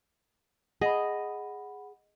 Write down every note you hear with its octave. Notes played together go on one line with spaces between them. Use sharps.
G#4 D#5 F#5 B5